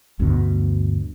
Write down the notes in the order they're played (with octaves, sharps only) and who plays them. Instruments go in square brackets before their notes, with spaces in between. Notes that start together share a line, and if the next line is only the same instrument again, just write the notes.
[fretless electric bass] D2 G2 B2